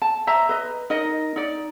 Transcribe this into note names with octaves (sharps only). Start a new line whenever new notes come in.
A5
C5 D#5 E5 A#5
B4 D#5
D#4 A#4 D#5
D#4 D5